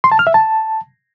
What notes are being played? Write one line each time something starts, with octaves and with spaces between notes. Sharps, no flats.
C6
A5
F6
E5
A5